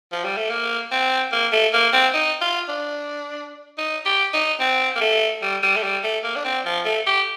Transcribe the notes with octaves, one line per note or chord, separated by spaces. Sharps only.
F3
G3
A3
A#3
C4
A#3
A3
A#3
C4
D#4
F4
D4
D#4
G4
D#4
C4
A#3
A3
G3
G3
A3
G3
A3
A#3
D4
C4
F3
A3
G4